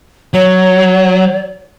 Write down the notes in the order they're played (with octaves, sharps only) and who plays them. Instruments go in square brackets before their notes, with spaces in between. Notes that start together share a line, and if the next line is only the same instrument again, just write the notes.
[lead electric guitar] F#3 [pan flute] C#5